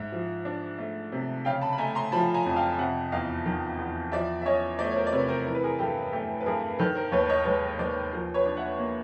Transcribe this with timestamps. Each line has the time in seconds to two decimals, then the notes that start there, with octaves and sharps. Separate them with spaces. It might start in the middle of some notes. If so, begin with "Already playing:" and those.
Already playing: G#2 E5
0.12 F3
0.45 D4
0.78 A3
1.12 C3
1.45 C#3 F5 G5
1.62 A5 B5
1.73 B5
1.78 A3 G#5 A#5
1.95 A#5 C6
2.12 F3 A5 B5
2.34 G#5 A#5
2.46 F2
2.56 F5 G5
2.78 C3 E5 F#5
3.12 E2 D#5 F5
3.46 D#3
3.78 E2
4.12 F3 D5 E5
4.42 E5
4.45 C#4 C#5 D#5
4.79 A3 C5 D5
4.91 C#5
4.96 A#4 C5
5.07 D5
5.12 C3 B4 C#5
5.29 A#4 C5
5.45 E3 A#4
5.55 B4
5.63 G#4 A#4
5.79 G2 G4 A4
6.12 A3 G4 A4
6.41 B4
6.46 G2 G#4 A#4
6.79 D#3 A4 B4
6.95 A#4 C5
7.12 D#2 B4 C#5
7.29 C#5 D#5
7.45 G#3 B4 C#5
7.79 D#2 C5 D5
8.13 F3 A#4 C5
8.34 B4 C#5
8.45 D4
8.57 E5 F#5
8.79 A#3